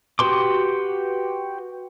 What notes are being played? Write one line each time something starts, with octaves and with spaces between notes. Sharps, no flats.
F#4 G4 B4 C6 D6